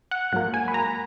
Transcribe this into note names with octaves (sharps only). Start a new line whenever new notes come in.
F#5
G#2 F#3 A#3 F#5
G#5
B5
A#5